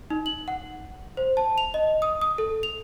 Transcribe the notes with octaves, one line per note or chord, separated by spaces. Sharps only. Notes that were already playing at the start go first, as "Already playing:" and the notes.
D#4
F#7
F#5
C5
A5
F7
D#5
D#6
D#6
A4
F7